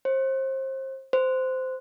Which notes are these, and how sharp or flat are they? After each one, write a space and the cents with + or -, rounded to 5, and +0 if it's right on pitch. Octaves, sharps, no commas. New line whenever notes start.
C5 +30
C5 -15